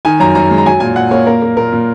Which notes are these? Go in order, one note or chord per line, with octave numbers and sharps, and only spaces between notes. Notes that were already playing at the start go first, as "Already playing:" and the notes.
D#3 G#5
F#2 A#5
F#2 A#5
G#3
A#5
F#3 G#5
A#2 G#5
A#2 F#5
A#3 C#5
A#3 A#4
A#3
A#2 A#4
A#2